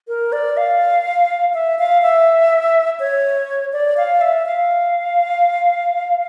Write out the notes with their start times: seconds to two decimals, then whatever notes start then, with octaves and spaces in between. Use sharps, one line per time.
0.08 A#4
0.32 D5
0.57 F5
1.54 E5
1.79 F5
2.02 E5
3.00 C#5
3.73 D5
3.97 F5
4.21 E5
4.46 F5